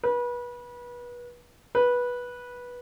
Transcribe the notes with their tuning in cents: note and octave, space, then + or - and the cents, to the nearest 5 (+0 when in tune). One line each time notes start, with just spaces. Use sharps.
B4 -30
B4 -15